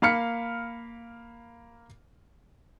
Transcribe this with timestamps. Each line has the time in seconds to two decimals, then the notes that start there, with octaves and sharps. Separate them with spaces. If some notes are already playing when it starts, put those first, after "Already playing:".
0.02 A#3 F5 B5 F6 C#7